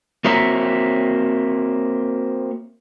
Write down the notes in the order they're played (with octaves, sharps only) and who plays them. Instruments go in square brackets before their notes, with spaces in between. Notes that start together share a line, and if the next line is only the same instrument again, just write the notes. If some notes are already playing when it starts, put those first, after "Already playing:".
[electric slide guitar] A#3 C4 F#4 C#5 E5 A#5